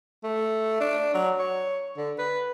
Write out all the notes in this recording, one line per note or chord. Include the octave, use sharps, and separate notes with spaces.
A3
D4
F#3
C#5
D3
B4